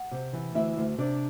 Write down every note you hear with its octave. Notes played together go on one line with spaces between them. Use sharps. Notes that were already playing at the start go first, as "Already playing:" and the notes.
Already playing: F#5
C3
E3
D2 E4 E5
D2
C3 D4 D5